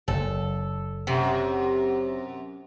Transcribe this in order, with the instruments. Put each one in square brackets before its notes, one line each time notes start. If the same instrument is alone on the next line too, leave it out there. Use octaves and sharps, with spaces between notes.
[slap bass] F#1 [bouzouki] A4
[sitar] F#2 [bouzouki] C3